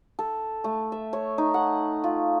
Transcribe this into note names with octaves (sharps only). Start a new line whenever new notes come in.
A4
A3
E5
C#5
D#4
F#5
F4